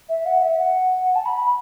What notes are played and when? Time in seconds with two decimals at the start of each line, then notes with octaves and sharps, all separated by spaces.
0.09 E5
0.26 F#5
0.42 E5
0.59 F#5
1.15 A5
1.26 B5